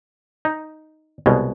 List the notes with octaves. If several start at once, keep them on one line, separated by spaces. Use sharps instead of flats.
D#4
C2 B2 G#3